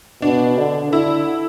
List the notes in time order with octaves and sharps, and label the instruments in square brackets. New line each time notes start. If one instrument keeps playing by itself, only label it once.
[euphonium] B2 [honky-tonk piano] D4
[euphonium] D3
[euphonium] D3 [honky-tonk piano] E4